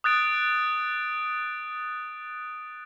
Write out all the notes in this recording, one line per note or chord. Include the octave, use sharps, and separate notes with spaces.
D#6 F#6 A6 D7